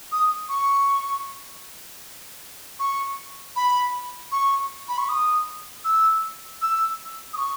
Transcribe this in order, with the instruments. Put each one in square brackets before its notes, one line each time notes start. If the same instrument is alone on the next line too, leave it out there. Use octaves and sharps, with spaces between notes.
[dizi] D#6
C#6
C#6
B5
C#6
B5
C#6
D#6
E6
E6
D#6
C#6